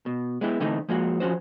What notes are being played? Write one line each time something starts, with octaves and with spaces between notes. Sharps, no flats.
B2
G#3 B3 E4 G4
D3 E3 A3 C4 D#4
F3 G#3 A#3 F#4
F3 C#4 F#4 C5